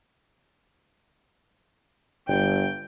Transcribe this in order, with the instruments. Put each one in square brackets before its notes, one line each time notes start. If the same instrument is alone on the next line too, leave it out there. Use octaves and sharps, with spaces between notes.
[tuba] G1 [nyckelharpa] G5